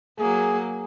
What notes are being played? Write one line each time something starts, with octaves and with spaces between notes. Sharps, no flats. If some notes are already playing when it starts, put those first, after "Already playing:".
F#3 A#3 G#4